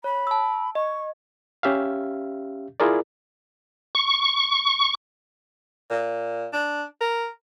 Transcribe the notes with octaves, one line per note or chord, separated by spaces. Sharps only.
C#5 B5
A5 E6
D#5 C#6
C#4 G4 E5 F5
E4 F4 G#4 A#4 D5
C#6
A#2
D4
A#4